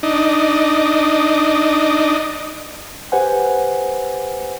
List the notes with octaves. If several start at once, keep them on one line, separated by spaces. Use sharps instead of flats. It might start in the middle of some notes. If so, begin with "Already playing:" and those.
D4 D#4
G4 B4 C5 F#5 G#5